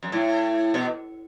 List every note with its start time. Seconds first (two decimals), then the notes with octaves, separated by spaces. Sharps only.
0.03 F#2
0.12 A2
0.74 B2